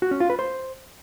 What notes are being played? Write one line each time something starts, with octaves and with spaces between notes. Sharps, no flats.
F#4
C#4
F4
B4
C5